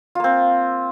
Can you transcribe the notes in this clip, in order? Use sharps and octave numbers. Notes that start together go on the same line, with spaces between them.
A#3 C4 F4